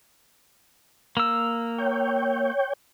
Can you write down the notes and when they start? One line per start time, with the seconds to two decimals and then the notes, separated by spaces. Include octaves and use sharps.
1.17 A#3 E6
1.78 C#5 G5